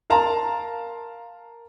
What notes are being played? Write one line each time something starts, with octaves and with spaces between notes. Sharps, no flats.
A#4 F5 A5 A#5 C6